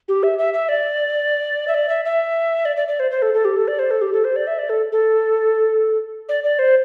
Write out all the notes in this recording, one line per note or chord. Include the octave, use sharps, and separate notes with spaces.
G4
E5
E5
E5
D5
E5
D5
E5
E5
D5
D5
D5
C5
C5
A4
A4
G4
A4
D5
C5
A4
G4
A4
C5
D5
E5
D5
A4
A4
D5
D5
C5